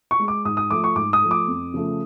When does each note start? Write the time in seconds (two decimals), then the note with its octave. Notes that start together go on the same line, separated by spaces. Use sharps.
0.11 C#6
0.19 G#3
0.28 D6
0.45 G#2 D#6
0.57 D#6
0.70 F3 A3 D6
0.84 C#6
0.96 G#2 D6
1.13 D#6
1.22 F3 A3
1.31 D6
1.48 F2
1.74 C#3 F3 A3